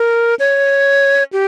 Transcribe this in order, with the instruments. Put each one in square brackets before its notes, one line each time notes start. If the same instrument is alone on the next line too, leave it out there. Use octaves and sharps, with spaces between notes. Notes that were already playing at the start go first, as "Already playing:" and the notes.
Already playing: [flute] A#4
C#5
G4